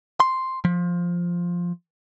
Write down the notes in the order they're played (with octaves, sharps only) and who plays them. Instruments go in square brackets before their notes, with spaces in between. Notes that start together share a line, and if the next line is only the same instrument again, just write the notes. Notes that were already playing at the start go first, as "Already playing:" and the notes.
[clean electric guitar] C6
F3